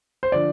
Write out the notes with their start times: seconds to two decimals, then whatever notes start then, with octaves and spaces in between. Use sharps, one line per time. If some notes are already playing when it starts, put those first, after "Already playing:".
0.23 C5
0.32 D3 F3 D5